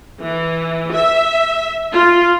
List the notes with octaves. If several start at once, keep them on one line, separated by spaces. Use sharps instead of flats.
E3
E5
F4